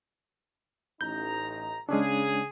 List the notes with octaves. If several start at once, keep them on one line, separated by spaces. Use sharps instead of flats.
A1 D#4 A#5 G6
C#3 G#3 C#4 D4 G#4